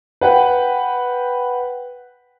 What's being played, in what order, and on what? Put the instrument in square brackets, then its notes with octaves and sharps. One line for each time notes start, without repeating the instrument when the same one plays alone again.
[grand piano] B4 F#5 G5